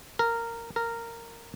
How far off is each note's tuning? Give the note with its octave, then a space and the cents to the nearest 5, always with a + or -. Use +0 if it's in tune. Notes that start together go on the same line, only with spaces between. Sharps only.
A#4 -10
A#4 -10